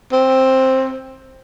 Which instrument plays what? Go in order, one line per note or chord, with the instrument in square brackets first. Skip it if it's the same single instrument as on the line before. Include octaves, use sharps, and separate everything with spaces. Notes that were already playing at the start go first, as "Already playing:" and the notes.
[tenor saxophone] C4